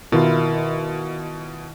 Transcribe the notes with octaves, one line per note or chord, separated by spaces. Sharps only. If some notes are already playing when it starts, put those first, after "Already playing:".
B2 D#3 E4 F4 A#4